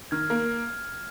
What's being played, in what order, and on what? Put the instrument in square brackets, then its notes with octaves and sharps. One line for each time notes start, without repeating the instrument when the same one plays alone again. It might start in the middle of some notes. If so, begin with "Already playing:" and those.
[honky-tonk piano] D#3 [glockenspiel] F6 G#6
[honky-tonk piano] A#3